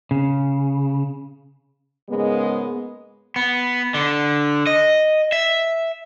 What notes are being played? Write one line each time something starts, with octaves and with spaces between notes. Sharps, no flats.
C#3
G#2 C#3 G#3 A#3 B3
B3
D3
D#5
E5